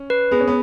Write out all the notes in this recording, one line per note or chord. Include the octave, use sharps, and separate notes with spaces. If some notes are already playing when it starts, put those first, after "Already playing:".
Already playing: C#4
B4
B3 G#4
C#4
B3